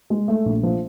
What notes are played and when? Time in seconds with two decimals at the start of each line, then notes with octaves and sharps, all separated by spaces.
0.10 G#3
0.28 A3
0.46 A#1
0.63 F3